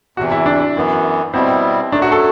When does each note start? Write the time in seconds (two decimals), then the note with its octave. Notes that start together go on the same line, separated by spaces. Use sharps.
0.17 E2 C3 E3 F#4
0.31 E4
0.46 D4
0.76 F#2 E3 B3
1.34 B2 G3 B3 C4 E4
1.92 F#2 F#3 A3 D4
2.02 F#4
2.12 A4